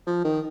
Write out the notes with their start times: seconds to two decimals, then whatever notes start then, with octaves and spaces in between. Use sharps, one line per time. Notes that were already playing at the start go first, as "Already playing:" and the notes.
0.07 F3
0.25 D#3